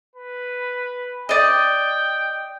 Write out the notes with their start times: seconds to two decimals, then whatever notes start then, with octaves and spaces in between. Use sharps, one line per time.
0.16 B4
1.29 D5 D#5 G5